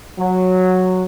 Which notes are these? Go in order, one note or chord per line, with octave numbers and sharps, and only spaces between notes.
F#3